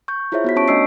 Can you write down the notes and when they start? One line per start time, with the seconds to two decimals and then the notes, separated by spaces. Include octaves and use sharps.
0.08 C#6 G6
0.32 E4 F4 G#4 C5 C#5 E5
0.44 B3 F#4 B6
0.56 C#4 C#5 A5 C#6 D7
0.68 A3 D4 D#5 E6 C7 D7